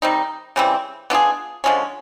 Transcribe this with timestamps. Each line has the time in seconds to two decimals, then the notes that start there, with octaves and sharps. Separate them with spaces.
0.02 D#3 G3 C4 D#4
0.56 C#3 E3 G3 C4
1.10 B3 D4 F4 G#4
1.64 D3 F3 G#3 C#4